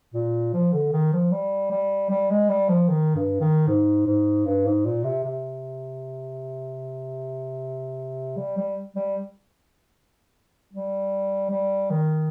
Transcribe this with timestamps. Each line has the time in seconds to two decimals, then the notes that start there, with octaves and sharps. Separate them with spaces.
0.14 A#2
0.53 F3
0.73 D3
0.92 D#3
1.13 F3
1.31 G3
1.71 G3
2.10 G3
2.30 G#3
2.49 G3
2.69 F3
2.89 D#3
3.15 G2
3.40 D#3
3.67 G#2
4.06 G#2
4.45 G2
4.65 G#2
4.85 A#2
5.04 C3
5.23 C3
8.37 G3
8.57 G3
8.96 G3
10.73 G3
11.51 G3
11.90 D#3